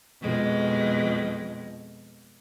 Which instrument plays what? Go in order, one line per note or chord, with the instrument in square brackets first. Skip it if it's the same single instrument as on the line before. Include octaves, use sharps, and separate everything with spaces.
[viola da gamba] F2 B2 G#3